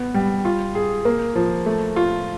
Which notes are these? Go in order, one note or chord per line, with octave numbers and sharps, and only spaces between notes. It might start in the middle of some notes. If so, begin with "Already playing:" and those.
Already playing: B3
G3
F4
G#4
A#3
F3
A3
F4